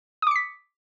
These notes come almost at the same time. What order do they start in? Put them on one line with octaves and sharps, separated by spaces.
D#6 D6 C#7 B6